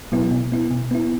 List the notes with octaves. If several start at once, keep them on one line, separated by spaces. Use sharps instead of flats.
B2 F#3 B3 E4
B2
B3 E4
B2
B3 E4